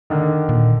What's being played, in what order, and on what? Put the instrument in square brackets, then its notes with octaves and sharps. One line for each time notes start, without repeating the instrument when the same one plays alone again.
[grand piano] D3 D#3
[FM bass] A#2